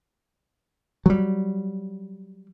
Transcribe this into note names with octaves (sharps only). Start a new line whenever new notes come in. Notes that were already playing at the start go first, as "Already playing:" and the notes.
F#3 G3